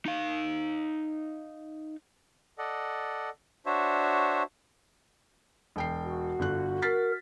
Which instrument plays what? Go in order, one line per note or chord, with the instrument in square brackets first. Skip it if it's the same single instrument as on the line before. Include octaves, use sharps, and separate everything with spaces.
[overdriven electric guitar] D#4 F5
[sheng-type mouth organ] A4 D5 D#5 F#5
D4 F#4 C5 C#5 E5
[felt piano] E1 G5 C7
[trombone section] F#4
[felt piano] G1 D3 F#6
[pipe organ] A#4 [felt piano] A6 B6 C7